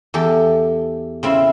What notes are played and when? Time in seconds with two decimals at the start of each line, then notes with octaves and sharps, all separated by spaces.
0.14 E2 G4 A4
1.23 C#3 C4 E4